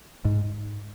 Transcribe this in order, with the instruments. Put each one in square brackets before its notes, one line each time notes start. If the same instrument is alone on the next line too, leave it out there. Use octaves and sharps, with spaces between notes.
[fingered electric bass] G#2